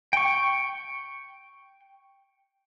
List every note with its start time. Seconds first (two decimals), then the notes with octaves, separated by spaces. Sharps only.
0.13 G5 C#6